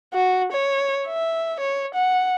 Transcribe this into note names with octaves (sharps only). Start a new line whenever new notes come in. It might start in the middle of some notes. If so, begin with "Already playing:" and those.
F#4
C#5
E5
C#5
F#5